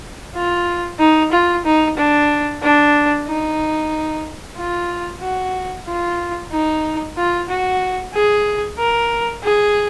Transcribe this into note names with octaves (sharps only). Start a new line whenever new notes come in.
F4
D#4
F4
D#4
D4
D4
D#4
F4
F#4
F4
D#4
F4
F#4
G#4
A#4
G#4